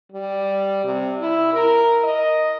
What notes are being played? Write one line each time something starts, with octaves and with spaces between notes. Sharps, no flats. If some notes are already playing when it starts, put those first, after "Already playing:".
G3
C3
E4
A#4
D#5